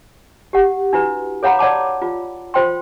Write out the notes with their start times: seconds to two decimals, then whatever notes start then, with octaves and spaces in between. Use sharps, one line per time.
0.53 G4 F#5
0.93 D4 E4 F#4 B4
1.43 A4 C#5 F5 F#5 A#5 B5
1.59 C#5 D5 F#5 A5 D6
2.02 F4
2.54 F4 C5 G5 C6